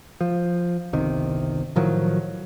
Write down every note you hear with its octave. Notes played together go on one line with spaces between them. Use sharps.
F3
G1 C2 C3 D#3
A2 D#3 F3 F#3